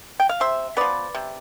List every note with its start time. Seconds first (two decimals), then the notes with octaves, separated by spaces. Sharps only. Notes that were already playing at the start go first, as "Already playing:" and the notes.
0.20 G5
0.29 F5
0.40 C3 C5 E5
0.77 F3 B3 B4 D5
1.15 C3